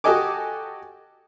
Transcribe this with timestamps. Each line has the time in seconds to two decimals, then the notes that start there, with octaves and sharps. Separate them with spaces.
0.04 F#4 G4 A4 D#5 G#5 D6